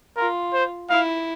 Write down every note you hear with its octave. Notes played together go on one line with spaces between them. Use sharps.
F4 A#4
C5
E4 F5